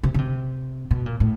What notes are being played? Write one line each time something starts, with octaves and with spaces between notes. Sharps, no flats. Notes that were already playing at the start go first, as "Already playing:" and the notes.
C3
C#3
C3
B2
A#2
A2